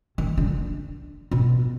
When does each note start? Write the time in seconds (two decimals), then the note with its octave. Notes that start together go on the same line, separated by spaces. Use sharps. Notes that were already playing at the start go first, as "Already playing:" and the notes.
0.18 D#3
0.37 D3
1.31 B2